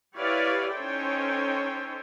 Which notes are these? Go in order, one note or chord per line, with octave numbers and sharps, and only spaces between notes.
E4 G4 B4 C#5 D5 F5
C#4 D#4 A4 C5 C#5 G5